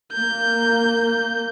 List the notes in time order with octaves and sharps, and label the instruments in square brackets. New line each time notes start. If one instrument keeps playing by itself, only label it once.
[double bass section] A#3 [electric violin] G6